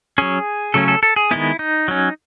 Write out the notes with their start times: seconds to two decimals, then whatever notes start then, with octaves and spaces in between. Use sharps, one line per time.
0.18 F#3 C#4 G#4
0.74 C#3 F#3 A3 C#4 A4
0.88 A4
1.03 A4
1.16 G#4
1.31 D#3 G#3 B3 E4
1.59 D#4
1.88 F#3 C#4